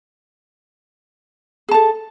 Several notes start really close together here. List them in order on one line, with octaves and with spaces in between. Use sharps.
G#4 A5 A4